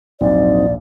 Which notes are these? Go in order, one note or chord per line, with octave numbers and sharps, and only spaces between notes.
A#1 D#2 G#2 F#3 C4 D#4 D5